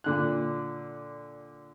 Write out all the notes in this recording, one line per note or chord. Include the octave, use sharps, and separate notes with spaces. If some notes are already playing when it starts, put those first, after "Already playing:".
A#2 D3 F#6